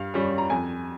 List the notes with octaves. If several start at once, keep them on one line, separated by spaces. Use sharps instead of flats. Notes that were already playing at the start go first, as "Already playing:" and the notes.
Already playing: G2 F5
G3 C#4
A#5
F2 G#5